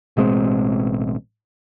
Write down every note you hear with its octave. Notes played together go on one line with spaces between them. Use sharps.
A1 B2 G#3 C4